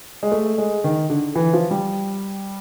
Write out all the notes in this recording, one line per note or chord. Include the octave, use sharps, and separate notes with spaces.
G#3
A3
G#3
D#3
D3
E3
F3
G3